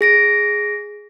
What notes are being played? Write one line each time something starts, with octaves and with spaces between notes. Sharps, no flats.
G#4 A#6 D7